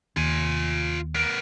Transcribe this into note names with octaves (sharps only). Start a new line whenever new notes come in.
D#2 F4 G#5
B3 A#4